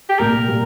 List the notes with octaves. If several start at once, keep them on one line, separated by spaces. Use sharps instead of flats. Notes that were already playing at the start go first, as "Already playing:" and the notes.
G4
C2 A#2 G3 A#3 A#4
A#2 G3 A#3